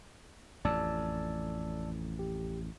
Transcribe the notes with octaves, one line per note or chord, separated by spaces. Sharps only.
A1 F2 D5 A5 E6
G4